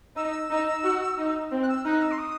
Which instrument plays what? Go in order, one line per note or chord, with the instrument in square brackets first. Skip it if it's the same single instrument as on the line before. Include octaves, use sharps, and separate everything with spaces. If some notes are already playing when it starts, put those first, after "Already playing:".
[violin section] D#4 [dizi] E6
[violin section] D#4
F#4
D#4
C4
[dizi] F#6
E6
[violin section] D#4 [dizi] F#6
[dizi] E6
C6
D#6